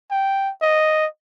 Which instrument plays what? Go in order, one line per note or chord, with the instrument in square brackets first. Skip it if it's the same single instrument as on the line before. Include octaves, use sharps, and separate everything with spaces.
[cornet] G5
D#5